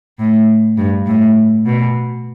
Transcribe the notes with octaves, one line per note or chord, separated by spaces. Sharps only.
A2
G2
A2
B2